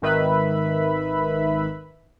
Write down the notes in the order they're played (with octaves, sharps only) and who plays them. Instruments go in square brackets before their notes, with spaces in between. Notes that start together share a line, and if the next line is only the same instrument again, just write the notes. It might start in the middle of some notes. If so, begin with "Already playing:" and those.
[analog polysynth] G#1 D#3 B4 E5 B5